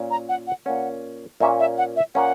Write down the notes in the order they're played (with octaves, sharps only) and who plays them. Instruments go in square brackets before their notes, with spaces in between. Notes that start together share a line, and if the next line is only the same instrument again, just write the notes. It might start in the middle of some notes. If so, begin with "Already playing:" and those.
Already playing: [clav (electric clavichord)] A#2 A#3 C#4
[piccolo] A#5
F#5
F#5
[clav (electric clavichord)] A#2 A#3 C#4 [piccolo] F#5
[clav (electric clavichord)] A#2 A#3 C#4 [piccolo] E5
[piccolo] E5
F#5
E5
[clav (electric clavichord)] A#2 A#3 C#4 [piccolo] F#5